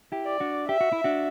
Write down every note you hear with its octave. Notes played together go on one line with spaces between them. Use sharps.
E4 G4
D5
D4 F#4
G4 E5
F#4
E4
D4 F#4